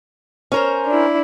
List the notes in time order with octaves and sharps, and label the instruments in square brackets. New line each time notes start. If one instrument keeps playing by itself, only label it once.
[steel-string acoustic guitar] C#4 A#4 C5
[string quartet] D4 E4